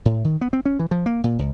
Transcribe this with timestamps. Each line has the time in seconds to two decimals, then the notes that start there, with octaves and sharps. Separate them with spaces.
0.05 A2
0.25 D#3
0.41 B3
0.53 C4
0.66 C#4
0.79 E3
0.91 F3
1.06 A#3
1.24 A#2
1.39 C#2